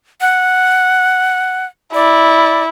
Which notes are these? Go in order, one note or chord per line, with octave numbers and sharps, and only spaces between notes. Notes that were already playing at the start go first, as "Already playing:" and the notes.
F#5
E4 D5